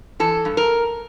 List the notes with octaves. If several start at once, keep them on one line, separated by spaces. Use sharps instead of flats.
E3 A4
G2
A#4